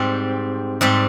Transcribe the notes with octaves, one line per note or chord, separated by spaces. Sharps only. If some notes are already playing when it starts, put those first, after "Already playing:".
Already playing: G#2 G3 C4
G#2 G3 C4